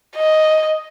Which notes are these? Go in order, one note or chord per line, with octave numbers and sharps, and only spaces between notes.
D#5